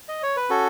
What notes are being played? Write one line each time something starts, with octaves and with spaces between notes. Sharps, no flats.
D#5
C#5
B4
C#4 F#4 A4